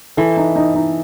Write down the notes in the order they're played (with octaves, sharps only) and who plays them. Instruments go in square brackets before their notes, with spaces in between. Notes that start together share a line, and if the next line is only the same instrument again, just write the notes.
[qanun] E3 [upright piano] A4
[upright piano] D#4
D#4
D#4